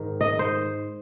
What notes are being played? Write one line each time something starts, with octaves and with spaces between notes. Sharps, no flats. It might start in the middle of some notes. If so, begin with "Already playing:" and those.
Already playing: G#2 D#3
D#5
C5